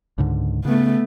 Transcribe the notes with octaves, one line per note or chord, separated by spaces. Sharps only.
C#2 G#2 D3
C#3 A3 B3